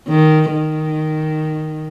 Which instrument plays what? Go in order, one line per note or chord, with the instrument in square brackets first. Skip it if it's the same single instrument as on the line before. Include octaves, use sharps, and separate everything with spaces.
[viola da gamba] D#3
D#3